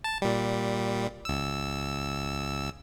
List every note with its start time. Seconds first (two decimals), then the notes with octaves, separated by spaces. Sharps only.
0.04 A5
0.22 A#2 G3
1.25 C#2 E6